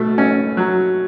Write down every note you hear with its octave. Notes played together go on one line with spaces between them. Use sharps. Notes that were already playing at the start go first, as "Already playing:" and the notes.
Already playing: B2 A3
C#4
F#3